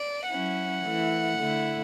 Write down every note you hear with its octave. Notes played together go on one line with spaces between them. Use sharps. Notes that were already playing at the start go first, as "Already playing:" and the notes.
Already playing: D5
F#3 C#4 E4 F#5
E3 A3 E4
D3 A3 E4